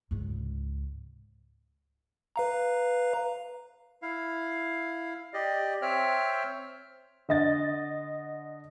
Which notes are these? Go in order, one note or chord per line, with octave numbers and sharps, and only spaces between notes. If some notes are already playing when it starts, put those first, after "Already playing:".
C#2 G#2
B4 F5 A#5
E4 F5
G4 D5 D#5
C4 C5 C#5 E5 G5 F6
D3 D#5 A6